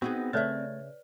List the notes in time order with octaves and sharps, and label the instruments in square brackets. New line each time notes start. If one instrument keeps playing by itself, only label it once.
[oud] B3 D#4 G#4 [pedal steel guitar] C4 [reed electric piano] F#4
[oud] C#3 E5 [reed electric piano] A3 G#6 A6 [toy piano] B4 C#5 D5